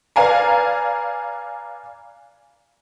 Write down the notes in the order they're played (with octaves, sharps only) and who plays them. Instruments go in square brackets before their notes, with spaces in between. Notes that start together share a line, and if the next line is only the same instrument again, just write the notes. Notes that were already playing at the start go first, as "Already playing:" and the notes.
[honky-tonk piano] B4 D5 F5 G#5 A#5